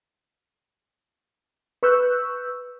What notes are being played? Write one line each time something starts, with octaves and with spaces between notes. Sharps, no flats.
B4 C#6 E6 F#6 G6